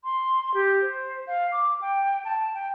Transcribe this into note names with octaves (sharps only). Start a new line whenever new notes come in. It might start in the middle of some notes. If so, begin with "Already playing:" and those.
C6
G4
C5
F5
D6
G5
A5
G5